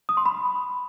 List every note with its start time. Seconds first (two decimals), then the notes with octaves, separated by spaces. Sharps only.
0.09 D#6
0.17 C6
0.26 B5